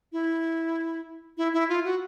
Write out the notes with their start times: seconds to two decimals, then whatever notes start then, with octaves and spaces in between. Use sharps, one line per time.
0.12 E4
1.37 E4
1.53 E4
1.69 F4
1.85 F#4